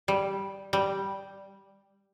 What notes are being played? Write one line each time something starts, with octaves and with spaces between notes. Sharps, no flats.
G3
G3